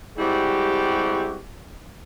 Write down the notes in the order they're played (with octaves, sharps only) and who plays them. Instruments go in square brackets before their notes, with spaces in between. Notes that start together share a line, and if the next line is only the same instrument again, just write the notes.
[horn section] G3 G#3 C4 E4 F#4 G4